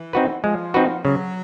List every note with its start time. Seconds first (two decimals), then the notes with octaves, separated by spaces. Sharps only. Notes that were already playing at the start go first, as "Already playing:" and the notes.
Already playing: E3
0.13 C4 D#4 F#4 B4
0.44 F3 G#3
0.74 C4 D#4 F#4 B4
1.04 C#3 F#3